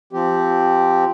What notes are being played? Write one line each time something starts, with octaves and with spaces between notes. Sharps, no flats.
F3 C4 G4